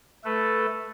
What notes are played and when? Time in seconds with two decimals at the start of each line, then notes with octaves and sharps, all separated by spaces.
0.24 A3 A4 B4